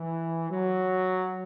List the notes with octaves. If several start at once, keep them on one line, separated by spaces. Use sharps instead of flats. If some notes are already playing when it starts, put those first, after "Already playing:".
Already playing: E3
F#3